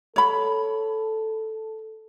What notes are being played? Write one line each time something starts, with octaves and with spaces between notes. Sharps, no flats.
A4 C#5 B5